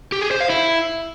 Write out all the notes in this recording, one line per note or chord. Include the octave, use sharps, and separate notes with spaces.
G4
G#4
C5
F5
E4